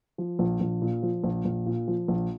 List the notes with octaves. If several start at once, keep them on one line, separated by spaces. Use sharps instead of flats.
F3
A#1
A#1
A#2
F3
A#1
A#1
A#2
F3
A#1